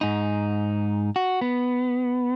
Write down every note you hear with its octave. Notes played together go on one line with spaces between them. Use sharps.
G#2 D#4
F#4
B3